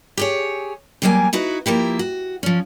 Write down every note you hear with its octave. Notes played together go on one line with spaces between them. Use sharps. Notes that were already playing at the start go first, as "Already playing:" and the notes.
G4 G#4 C#5
E2 F#3 G3 A#3 D5 G#5
D#4 E4 F#4 B4
F3 A#3 E4 G4
F#4
F3 C#4